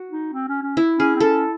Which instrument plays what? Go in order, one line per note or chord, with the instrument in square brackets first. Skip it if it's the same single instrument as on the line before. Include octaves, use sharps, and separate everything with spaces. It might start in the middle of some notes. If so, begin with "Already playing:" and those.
Already playing: [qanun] F#4
[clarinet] D#4
C4
C#4
C#4
[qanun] E4
[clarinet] C#4 [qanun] G#4
[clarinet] C4
[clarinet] C#4 [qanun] A4